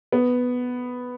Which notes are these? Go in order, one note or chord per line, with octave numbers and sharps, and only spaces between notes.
B3